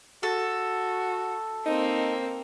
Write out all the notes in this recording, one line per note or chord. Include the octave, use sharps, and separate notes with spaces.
F#4 A4
A#3 C4 D#4